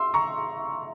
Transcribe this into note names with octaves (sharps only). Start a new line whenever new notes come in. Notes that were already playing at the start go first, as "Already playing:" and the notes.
Already playing: C6 E6
A#5 C#6